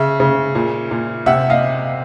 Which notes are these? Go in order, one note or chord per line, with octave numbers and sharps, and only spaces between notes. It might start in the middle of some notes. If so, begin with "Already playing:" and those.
Already playing: C#3 E5
C#3
A#2
A#2
C3 E5 F#5
D#5 F5